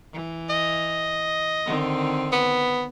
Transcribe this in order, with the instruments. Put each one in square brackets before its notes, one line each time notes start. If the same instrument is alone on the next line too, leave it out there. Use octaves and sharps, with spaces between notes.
[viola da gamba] E3
[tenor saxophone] D#5
[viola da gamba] D3 D#3 C4
[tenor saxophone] B3